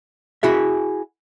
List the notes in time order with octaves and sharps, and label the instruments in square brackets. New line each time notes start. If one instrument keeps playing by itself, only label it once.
[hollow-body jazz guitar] E4 F#4 G#4 E5